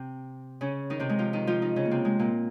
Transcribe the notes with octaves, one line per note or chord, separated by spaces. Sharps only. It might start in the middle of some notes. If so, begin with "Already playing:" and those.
Already playing: C3 C4
C#3 C#4
D#3 D#4
C3 C4
G#3
F3 F4
D#3 D#4
F3 F4
D#3 D#4
C#3 C#4
A#3
C3 C4
G#3
A#2 A#3